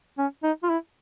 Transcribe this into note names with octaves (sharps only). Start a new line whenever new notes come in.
C#4
D#4
F4
E4